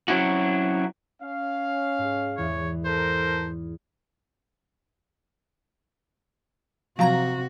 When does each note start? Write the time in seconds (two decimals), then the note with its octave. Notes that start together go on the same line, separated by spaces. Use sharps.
0.08 F#3 C4 C#4 E4 F#4
1.22 C#4 F5
1.98 G#2
2.37 E2 E3 C#5
2.85 A4 A#4 C5
6.99 C3 F3 F#3 F#4 F5 A#5